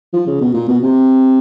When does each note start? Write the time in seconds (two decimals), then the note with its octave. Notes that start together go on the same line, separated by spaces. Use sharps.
0.14 F3
0.27 C#3
0.41 B2
0.54 A#2
0.68 B2
0.83 C3